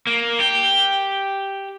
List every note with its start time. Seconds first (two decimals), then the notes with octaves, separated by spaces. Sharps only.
0.07 A#3
0.40 G4